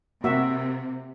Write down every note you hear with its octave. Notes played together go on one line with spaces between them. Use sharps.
C3 A#3 F#4 E5